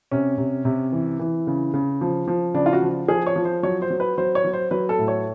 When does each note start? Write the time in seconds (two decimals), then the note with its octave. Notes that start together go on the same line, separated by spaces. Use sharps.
0.11 C3 C#4
0.38 C3
0.65 C3
0.92 E3
1.19 E3
1.47 C#3
1.74 C#3
2.01 F3
2.28 F3
2.54 C#3 D4
2.66 F4
2.73 F#4
2.82 F3
3.08 F3 G#4
3.27 C#5
3.36 F3
3.45 C5
3.63 F#3 C#5
3.82 C5
3.90 F#3
4.00 B4
4.18 F#3 C5
4.35 C#5
4.45 F#3
4.53 C5
4.71 F#3 B4
4.89 A4
4.98 A2
5.08 C#5